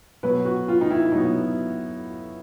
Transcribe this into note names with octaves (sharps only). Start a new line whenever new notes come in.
B2 F#3 B3 B4
F#4
F4
D#4
E4
B2 F#3 B3 D#4